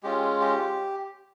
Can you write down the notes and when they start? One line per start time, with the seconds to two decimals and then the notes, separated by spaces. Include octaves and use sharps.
0.03 G#3 C#4 F4 G4
0.41 G4